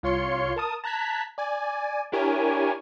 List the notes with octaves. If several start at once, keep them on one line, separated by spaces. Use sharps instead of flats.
C2 F4 C#5 C6 C#7
A#4 A5 D#6
A5 A#5 F#6 G#6 B6
D5 G#5
D4 E4 G4 A#4 C#5 G#5